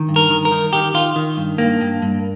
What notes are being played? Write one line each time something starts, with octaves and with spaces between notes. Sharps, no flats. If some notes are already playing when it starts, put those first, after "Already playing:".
Already playing: D#3
G2
A#4
D#3
A#4
D#3
D#3 G4
D#3 F4
D#3
G2
G2 A#3
G2
G2